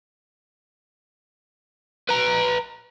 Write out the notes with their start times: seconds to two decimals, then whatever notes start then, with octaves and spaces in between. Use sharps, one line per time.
2.09 B4 A#5